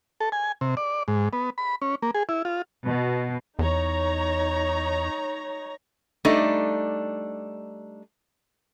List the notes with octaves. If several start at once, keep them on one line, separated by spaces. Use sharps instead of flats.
A4
G#5
C3
D5
G#2
B3
B5
C#4
A#3
G#4
E4
F4
B2
E2 D#4 C#5 A#5
G3 A3 D4 D#4